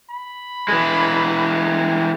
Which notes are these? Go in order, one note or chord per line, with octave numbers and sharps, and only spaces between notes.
B5
E3 G#3